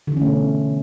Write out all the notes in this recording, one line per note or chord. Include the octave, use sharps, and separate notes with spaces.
B2 D3 E3 A3 C#4